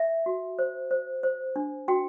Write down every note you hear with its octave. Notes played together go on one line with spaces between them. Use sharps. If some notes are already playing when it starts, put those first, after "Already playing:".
Already playing: E5
F#4
C5
C5
C5
D4
F#4 G5